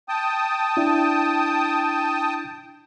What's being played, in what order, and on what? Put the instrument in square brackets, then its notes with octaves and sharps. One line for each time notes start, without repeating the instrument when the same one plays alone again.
[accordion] G5 A5 D#6
[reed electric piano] D4 E4